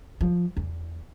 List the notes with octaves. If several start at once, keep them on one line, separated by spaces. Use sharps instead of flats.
F3
E2